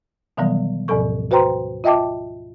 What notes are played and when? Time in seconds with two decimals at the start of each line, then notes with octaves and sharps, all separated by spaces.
0.37 B2 D#3 E3 F#3 G3 B3
0.88 D2 G#2 B2 F3 A4 C#6
1.31 F#4 B4 C5 G5 A#5 C6
1.84 F4 D#5 E5 G5 A5 D6